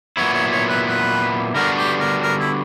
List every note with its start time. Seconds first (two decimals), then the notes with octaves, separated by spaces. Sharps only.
0.17 A#2 F#3 B3 E4 C#5
0.34 C#5
0.52 C#5
0.69 B4
0.87 B4
1.55 D3 G3 B3 D4 F#4 A#4
1.77 G4
2.00 A#4
2.23 A#4
2.40 E4